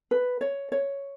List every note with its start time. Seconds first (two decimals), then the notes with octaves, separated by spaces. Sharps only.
0.11 B4
0.41 C#5
0.72 C#5